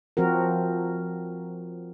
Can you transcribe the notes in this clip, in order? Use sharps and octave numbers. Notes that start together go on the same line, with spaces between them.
F3 C4 F#4 A#4